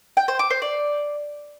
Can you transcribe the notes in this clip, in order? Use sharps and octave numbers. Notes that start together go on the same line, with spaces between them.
G5
C5
D6
C5
D5